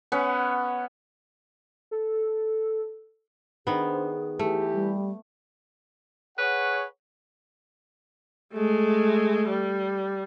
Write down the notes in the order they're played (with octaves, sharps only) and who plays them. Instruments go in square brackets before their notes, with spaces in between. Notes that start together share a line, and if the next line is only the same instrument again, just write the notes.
[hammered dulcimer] B3 C#4 F#5
[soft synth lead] A4
[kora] D#3 B3 [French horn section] D4 C5 [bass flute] G#4
[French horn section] E3 G4 [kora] A3
[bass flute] G3
[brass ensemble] G#4 C#5 F#5 [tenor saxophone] B4
[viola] G#3 A3
G3